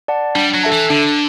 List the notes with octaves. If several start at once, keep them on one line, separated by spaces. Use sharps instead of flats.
D5 F#5 A5
G3 D4
F#3
A4 E5 A5
E3
D3 D4